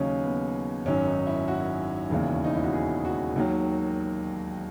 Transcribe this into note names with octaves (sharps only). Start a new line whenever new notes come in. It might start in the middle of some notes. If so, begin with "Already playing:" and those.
Already playing: D#2 C#3 F#3 C#4 D#4
B3
G#1 F#2 D#3 F#3 C#4
D#4
E4
F#4
E1 D#2 C#3 E3
D#4
E4
F#4
G#4
F#4
D#2 D#3 F#3